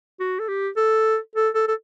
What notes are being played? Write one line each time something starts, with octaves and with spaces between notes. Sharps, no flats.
F#4
A4
G4
A4
A4
A4
A4